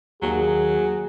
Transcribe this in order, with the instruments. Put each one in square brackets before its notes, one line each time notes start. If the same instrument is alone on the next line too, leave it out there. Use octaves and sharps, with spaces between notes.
[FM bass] D#2 [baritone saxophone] F#3 [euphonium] G#4